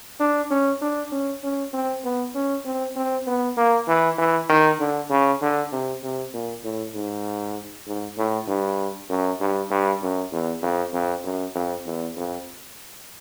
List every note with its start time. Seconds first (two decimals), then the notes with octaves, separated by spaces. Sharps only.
0.20 D4
0.50 C#4
0.81 D4
1.12 C#4
1.43 C#4
1.74 C4
2.04 B3
2.35 C#4
2.65 C4
2.96 C4
3.27 B3
3.57 A#3
3.88 E3
4.18 E3
4.49 D#3
4.80 D3
5.10 C#3
5.42 D3
5.72 C3
6.03 C3
6.34 A#2
6.64 A2
6.95 G#2
7.87 G#2
8.17 A2
8.48 G2
9.10 F#2
9.41 G2
9.71 G2
10.02 F#2
10.32 E2
10.62 F2
10.93 F2
11.24 F#2
11.55 F2
11.86 E2
12.16 F2